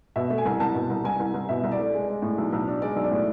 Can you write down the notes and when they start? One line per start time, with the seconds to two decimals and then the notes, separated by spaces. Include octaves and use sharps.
0.16 B2 E5
0.30 A3
0.38 G#5
0.45 C2
0.60 C2 A5
0.75 B2
0.90 C2
1.04 C2 G#5
1.19 C2
1.34 C2
1.49 B2 E5
1.63 C2
1.72 D5
1.79 A3
1.93 G#3
2.08 G#3
2.22 A2
2.38 B1
2.52 B1
2.68 D4
2.82 G#3 D5
2.96 B1
3.04 D5
3.11 A2